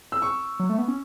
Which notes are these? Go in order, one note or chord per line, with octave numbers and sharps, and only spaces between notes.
E6
C#6
F#3
A3
B3
C#4